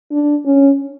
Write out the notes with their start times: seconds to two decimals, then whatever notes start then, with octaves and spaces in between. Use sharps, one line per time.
0.12 D4
0.46 C#4